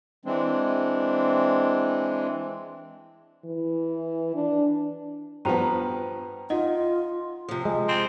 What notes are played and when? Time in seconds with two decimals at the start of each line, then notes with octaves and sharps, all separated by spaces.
0.25 E3 G#3 C4 D4
3.45 E3
4.35 D4
5.45 G2 F3 B3 C5 G5 A#5
6.50 D#4 F4 D#5 F#5
7.48 C3 F3
7.65 G#3
7.88 C4